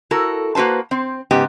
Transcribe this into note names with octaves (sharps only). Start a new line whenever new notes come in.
E4 F#4 A4 A#4
A#3 F#4 B4 C5 A5
C4 C5
G#2 C#3 B3 G4